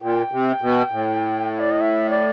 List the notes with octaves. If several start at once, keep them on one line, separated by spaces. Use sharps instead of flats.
A#2 G5
C3
B2
A2
D5
D#5
E5
D5